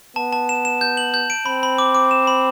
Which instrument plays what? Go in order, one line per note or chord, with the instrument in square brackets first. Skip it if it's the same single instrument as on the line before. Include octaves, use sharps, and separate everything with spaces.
[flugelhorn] B3 [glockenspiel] A5
[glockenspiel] A5
E7
E7
G6
F#7
G6
D7
[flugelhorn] C4 [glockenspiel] B5
[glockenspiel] B5
D6
D6
E7
B5